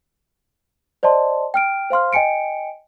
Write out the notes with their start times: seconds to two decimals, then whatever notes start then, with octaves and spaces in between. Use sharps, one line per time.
1.03 C5 D5 D#5 A5 C6
1.54 G5 F6 D7
1.90 C5 F5 C6 F6
2.13 D#5 G5 G#5 C#7 D7